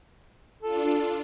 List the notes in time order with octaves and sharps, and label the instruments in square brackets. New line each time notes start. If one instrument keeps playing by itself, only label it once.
[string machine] D4 F4 [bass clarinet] A4